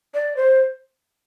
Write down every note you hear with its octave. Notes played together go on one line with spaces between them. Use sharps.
D5
C5